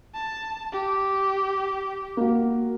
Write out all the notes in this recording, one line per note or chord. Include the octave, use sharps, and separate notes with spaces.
A5
G4
A#3 F#4